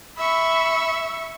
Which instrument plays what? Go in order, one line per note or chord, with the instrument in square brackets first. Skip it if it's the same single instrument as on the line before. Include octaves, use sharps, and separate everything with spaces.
[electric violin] E5 C#6 [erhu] B5